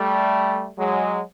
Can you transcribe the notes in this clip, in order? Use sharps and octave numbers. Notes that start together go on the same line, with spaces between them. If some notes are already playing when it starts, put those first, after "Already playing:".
Already playing: G3 A3
F#3 G#3